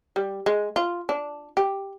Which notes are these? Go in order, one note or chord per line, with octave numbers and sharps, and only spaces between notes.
G3
G#3
F4
D4
G4